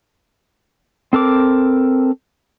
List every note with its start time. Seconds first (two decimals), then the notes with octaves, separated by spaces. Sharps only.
1.13 C4 A4 A#4 D6